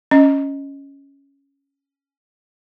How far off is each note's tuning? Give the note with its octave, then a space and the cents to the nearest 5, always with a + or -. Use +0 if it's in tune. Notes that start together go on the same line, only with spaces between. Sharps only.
C#4 +0 D#5 +0